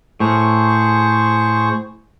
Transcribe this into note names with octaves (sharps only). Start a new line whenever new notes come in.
A2 G#4 C5 C#6